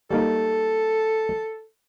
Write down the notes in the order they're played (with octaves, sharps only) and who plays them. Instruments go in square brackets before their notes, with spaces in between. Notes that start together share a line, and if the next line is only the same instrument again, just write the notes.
[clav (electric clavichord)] G3 A#3 D#4 [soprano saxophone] A4